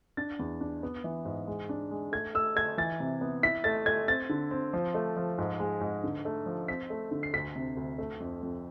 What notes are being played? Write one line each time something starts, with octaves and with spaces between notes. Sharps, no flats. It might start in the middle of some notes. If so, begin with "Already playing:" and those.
D4 A6
E2
D4
B3
E3
G#2
G#3
D4
G#3
A3 G#6
A3 E6
A3 G#6
E3 A6
C3
B3
E4 B6
A3 A6
A3 G#6
C4 A6
D3
C4
F3
A3
F3
G#2
G#3
G#2
D3
A3
F3
C4 B6
A3
D3
C7
D2 B6
C3
D2
A3
F2
F2